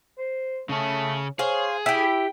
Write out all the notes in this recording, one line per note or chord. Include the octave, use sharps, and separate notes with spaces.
C5
C#3 A3 C#4
G#4 C5 C#5 F5
E4 G4 G5